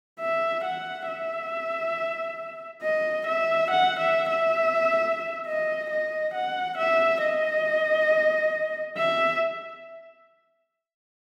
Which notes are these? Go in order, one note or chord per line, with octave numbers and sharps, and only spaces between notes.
E5
F#5
E5
D#5
E5
F#5
E5
E5
D#5
D#5
F#5
E5
D#5
E5